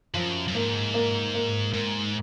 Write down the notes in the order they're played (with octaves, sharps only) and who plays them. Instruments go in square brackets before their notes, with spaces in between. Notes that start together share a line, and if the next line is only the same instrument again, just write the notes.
[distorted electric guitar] F#2 [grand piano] F3
[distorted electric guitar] F#2
[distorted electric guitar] G#2 [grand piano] A#3
[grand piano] A#3
A#3
[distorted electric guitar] G#2 [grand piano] A#3